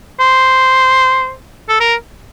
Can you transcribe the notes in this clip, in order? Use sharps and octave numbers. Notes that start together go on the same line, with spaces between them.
C5
A4
A#4